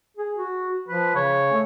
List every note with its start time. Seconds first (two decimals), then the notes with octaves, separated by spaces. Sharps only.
0.17 G#4
0.37 F#4
0.88 F3 B4
1.15 C#3 C#5
1.52 A3